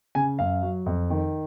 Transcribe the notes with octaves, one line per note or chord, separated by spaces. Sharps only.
C#3 G#5
F#2 F5
F#3
F2
D#3